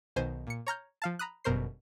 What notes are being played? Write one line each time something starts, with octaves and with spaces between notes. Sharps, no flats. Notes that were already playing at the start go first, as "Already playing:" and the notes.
B1 B2 D#3 C5 G#5
A#2 C#7
C#5 A#5 F6 G6
F3 F5 A5
A#5 B5 D#6 F#6
G1 F#2 B2 A#4 C5 C7